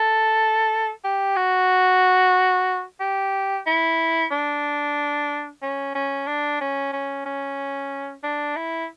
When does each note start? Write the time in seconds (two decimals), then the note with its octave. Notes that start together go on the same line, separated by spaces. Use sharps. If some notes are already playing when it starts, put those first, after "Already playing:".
Already playing: A4
1.04 G4
1.36 F#4
3.00 G4
3.66 E4
4.32 D4
5.62 C#4
5.95 C#4
6.27 D4
6.61 C#4
6.93 C#4
7.26 C#4
8.24 D4
8.56 E4